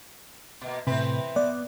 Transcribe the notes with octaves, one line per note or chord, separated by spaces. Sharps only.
B2 A#3
A2 C3 E3 C4 B4
B3 D5